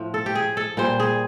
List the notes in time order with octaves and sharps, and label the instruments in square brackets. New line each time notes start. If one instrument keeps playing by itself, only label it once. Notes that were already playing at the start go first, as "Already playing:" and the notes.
Already playing: [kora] A2 F3
A4
G4
G#4
A4
A#2 G3 C5
G#4